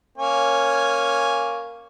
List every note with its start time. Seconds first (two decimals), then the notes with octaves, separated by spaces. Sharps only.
0.18 A#3 C#4 G#5